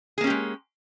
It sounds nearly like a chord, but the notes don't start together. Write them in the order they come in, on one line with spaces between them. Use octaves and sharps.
G#4 A#3 C#4 G4 G#3